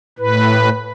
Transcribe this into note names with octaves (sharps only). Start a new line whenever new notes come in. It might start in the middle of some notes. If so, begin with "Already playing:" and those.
A2 B4